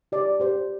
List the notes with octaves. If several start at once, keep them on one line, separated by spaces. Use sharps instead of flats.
G4 D5
G4 C5